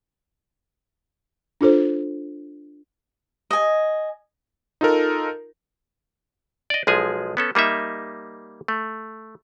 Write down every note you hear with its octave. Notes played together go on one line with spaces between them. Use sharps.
D4 F4 A4 C5
D#5 G#5
D#4 F4 A4 A#4
D5 D#5
B1 F3 G#3 G#4 G#5
B3 C#4 A4
G3 A#3 D#4 E5
A3